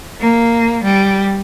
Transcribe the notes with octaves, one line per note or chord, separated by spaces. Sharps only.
A#3
G3